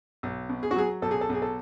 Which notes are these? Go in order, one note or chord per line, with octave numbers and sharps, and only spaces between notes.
B1
B2
G#4
F#4
F#3 G#4
B1 A4
G#4
A4
B1 G#4
A4